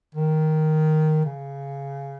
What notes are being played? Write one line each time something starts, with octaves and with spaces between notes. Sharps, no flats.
D#3
C#3